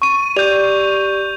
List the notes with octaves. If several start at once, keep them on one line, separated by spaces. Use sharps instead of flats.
C#6 D#7
G4 D5 G6 F7